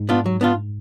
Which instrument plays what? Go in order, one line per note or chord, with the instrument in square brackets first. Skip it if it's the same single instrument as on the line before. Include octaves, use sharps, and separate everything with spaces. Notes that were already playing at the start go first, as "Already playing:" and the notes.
Already playing: [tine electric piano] G#2
[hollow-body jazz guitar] B3 D4 F4
F#3
B3 D4 F4